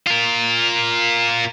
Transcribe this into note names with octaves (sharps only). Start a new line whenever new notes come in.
F4 A#4